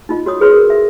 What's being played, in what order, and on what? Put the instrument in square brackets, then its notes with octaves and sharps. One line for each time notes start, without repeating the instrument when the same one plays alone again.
[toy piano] D#4 F4 D#5
F#4 C#5 D#6
G#4 B4 C#5 C6 D#6
A#4
F#4 E5